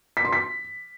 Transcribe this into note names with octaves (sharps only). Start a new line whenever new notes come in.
B6
C6
B6